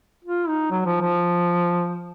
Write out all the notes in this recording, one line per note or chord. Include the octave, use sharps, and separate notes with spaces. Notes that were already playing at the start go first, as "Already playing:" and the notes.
F4
D#4
F#3
F3
F3